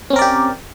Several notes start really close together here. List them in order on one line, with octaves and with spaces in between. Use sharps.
C#4 C4 A#4 D5 G4